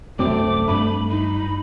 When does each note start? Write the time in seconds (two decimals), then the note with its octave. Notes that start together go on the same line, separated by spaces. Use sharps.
0.19 C2 F#2 A3 C4 D6
0.68 G2 B5
1.10 D#4 B5